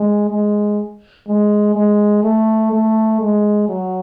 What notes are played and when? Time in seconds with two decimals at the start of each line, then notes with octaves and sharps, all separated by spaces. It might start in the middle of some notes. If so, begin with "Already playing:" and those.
Already playing: G#3
0.30 G#3
1.27 G#3
1.75 G#3
2.24 A3
2.72 A3
3.21 G#3
3.69 F#3